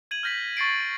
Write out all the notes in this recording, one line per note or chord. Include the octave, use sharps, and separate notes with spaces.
G#6 D#7 F#7
F6 G6 A#6 B6 F#7
C#6 A6 C7 D7